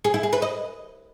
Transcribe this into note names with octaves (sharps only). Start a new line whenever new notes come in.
G#4
E4
G#4
B4
D#5